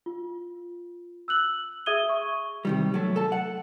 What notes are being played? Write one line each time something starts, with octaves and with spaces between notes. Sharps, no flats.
F4
E6 F#6 F#7
G#4 E5 D#6 G#6 D#7 G7
C#6
C3 D#3 G3
F#3 A3
A4 A5
F#5